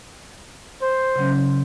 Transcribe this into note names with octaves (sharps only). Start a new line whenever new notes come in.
C5
C#3 F#3 C#4